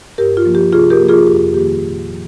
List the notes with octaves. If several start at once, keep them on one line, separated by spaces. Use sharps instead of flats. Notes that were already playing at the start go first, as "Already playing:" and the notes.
G2 G4 A#4
F4
F3 A#3
G4
C3 F4 G#4
G4 A#4
F3 A#3
F4 G#4
F2 G4
D#3 G3 A#3 G4
A#2
F3